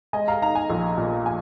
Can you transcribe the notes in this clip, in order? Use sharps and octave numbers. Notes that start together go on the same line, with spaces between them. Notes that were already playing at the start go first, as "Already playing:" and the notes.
G#3 D#5 G#5
F5 A#5
D#4 F5 A#5
D#5 G#5
A#1
A#2
G#5